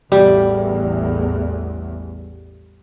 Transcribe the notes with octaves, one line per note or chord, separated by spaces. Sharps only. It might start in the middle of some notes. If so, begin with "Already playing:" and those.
A1 E2 A2 G3